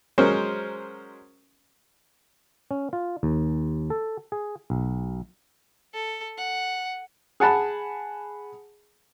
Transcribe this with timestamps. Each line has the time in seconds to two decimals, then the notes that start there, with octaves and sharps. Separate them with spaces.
0.18 F#3 G#3 C#4 A#4 C5
2.71 C#4
2.93 F4
3.23 D#2
3.90 A4
4.32 G#4
4.70 B1
5.94 A4
6.37 F#5
7.40 G#4 F#5 A5 B5